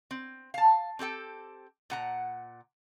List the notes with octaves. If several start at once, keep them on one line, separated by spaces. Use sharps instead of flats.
C4
F5 A5
C4 G4 A4 G5
A#2 F#5 A#5